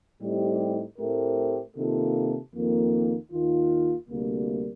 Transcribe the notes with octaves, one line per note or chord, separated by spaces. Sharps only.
A2 G3 C4 D#4 G4
A2 A3 C4 G4 A#4
C3 D#3 A#3 F4 A4
F2 D#3 A#3
D#2 D#3 A#3 F4
D2 C3 G3 A#3